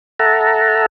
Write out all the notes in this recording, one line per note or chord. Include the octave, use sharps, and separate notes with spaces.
A4 E5 F#5 A5 A#5